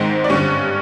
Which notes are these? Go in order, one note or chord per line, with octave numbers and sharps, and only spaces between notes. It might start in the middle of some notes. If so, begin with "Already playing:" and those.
Already playing: G#2 D#3 G#3 C4 C5
D5
G2 D3 G3 C#4 C#5